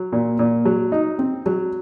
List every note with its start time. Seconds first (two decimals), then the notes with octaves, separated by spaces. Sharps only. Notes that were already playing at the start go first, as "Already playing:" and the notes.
Already playing: F#3
0.13 A#2
0.39 A#2
0.65 F#3
0.92 D#4
1.19 C4
1.46 F#3